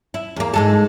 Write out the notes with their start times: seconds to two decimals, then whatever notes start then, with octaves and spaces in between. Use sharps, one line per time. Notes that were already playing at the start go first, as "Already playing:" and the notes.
0.14 E4
0.36 E2 A#3
0.54 G#2 G#3 A4